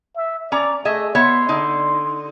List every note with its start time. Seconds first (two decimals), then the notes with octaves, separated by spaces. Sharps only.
0.16 E5
0.52 C#4 D5 A#5
0.85 A3 G#4 D#5 E5
1.15 B3 C#5 E5 C6
1.49 D3 D#4